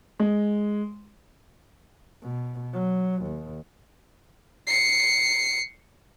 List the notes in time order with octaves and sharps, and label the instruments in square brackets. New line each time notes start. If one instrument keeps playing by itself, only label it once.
[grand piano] G#3
[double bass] B2
F#3
D#2
[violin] C7 C#7